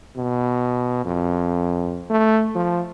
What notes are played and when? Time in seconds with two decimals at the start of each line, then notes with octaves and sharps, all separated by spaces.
0.17 B2
1.05 F2
2.10 A3
2.55 F3